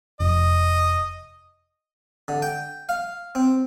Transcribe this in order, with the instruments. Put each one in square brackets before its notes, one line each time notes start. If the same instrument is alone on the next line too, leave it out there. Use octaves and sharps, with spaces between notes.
[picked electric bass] F1 [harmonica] D#5
[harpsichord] D3
G5
F5
C4